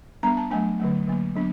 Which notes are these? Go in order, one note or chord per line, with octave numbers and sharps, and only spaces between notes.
G3 B3 D4 A#5
A5
F#3 A3 D4 G#5
D3 F#3 A3
D3 F#3 A#3
F#3 B3 D4